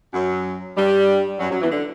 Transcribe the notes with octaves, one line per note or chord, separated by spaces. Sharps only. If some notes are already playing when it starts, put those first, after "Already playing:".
F#2 F#3
G2 G3
F#2 F#3
F#2 F#3
E2 E3
D3